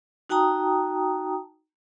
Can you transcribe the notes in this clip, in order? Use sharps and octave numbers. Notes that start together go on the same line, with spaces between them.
D#4 F#4 G5 A5 A#5 D#6